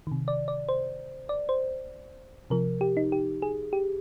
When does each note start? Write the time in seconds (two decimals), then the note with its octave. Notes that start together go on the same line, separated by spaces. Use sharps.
0.07 C3 D#3
0.28 D5
0.48 D5
0.69 C5
1.29 D5
1.49 C5
2.50 C3 F3 A#4
2.81 G4
2.97 D#4
3.12 G4
3.42 G#4
3.73 G4